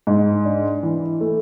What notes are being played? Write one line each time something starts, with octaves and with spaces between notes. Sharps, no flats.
G#2
D4
E3
A3